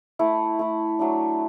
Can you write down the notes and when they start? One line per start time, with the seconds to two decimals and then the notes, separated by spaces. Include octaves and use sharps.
0.19 A3 E4
0.59 A3 E4
0.99 F#3 A3 D4